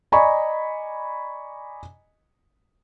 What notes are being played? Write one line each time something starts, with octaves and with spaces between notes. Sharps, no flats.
D5 D#5 G#5 A#5 B5 C#6